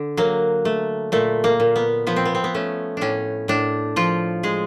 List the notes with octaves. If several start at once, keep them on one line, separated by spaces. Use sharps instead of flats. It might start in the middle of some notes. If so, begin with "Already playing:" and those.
Already playing: D3
F#3 A#3
A3
A#2 A3
A#3
A#2
B3
F3 B3
C4
B3
C4
B3
A3 C#4
A2 C#4 D4
A2 D4
F3 F4
G#3 G#4